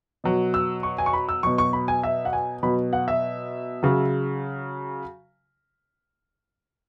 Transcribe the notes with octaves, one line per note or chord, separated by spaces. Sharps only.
B2 F#3
E6
C#6
G#5
C#6
B5
E6
B2 F#3 C#6
C#6
B5
G#5
E5
F#5
G#5
B2 F#3 B5
F#5
E5
C#3 F#3